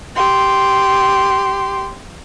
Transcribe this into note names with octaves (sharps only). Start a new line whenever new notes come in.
G4 C6